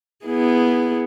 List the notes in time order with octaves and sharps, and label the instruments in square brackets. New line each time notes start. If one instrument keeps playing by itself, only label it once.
[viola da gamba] B3 E4 G#4